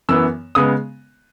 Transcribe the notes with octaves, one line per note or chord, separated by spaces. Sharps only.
F#2 E3 B3 E6
C#3 G#3 B3 D#6